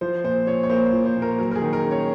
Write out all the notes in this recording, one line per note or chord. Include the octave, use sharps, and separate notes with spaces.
F3 C5
A#2 C5
A#2 C#5
C#5
A#3 C5
F3
C5
A#2
A#4
F#3 A#4
A#4
G#4
D#3
A#4
C#4
C#5